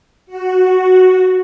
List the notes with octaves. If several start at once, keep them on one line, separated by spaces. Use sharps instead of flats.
F#4